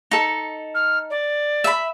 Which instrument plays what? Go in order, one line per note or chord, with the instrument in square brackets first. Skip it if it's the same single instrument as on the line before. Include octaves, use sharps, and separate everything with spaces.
[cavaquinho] D#4 A4
[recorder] F6
D5
[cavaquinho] E5 B5